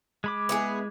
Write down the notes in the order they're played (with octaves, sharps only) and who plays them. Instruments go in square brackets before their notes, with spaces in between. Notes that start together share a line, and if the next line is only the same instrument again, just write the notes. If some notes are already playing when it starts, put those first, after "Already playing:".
[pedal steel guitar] G#3 B5 D6
[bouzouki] B3 E4 G#4